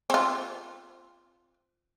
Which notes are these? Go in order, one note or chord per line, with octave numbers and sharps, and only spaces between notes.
C4 F4